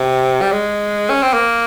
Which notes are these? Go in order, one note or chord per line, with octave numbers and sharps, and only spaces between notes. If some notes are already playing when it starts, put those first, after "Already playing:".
Already playing: C3
G3
G#3
C#4
C4
A#3